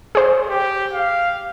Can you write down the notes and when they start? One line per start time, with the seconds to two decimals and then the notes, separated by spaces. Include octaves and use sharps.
0.15 G#4 C5
0.50 G4
0.93 F5